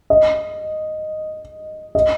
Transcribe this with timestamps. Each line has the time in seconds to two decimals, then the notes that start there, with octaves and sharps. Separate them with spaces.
0.10 D#5
1.95 D#5